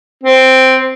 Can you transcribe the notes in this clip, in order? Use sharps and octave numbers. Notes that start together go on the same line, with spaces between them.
C4